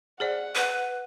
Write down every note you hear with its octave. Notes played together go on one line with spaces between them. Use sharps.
G#4 C5 D5 F#5
B4